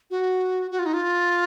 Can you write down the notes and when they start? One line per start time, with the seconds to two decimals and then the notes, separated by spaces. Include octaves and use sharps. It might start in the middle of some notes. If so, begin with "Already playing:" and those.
0.11 F#4
0.71 F#4
0.79 F4
0.86 D#4
0.94 F4